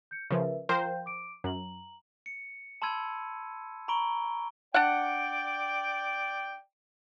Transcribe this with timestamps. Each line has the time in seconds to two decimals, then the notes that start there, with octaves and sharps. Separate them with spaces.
0.11 G6 C#7
0.31 C#3 F3 A#4 B4 E5
0.69 F3 A#4 C5 F5 G5 G6
1.06 D6 D7
1.44 F#2 A#5 F#7
2.26 C#7
2.82 A5 B5 C6 E6 G#6 D#7
3.88 A#5 B5 C#6 D7 G7
4.74 D4 D5 F#5 G5